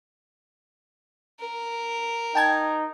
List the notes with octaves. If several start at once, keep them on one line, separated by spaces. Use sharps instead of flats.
A#4
D#4 G5 A5 G#6